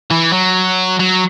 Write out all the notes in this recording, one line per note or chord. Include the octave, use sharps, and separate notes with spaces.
E3
F#3
F#3